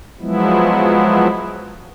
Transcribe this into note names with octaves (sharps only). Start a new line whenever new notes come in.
F3 F#3 G#3 B3 E4